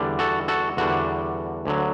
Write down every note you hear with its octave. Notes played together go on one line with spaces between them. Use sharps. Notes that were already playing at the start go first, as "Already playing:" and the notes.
Already playing: E2 D3 G3 D4
F#4 A4
F#4 A4
E2 D3 G3 D4 F#4
D2 D3 F#3